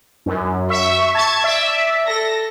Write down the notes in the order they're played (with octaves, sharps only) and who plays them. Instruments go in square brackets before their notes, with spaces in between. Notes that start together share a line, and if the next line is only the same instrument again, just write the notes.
[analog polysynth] F#2
[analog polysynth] E5 [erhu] C#6
[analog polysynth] A5 G#6
[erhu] D5 [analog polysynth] E5
[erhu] A4 [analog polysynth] A#6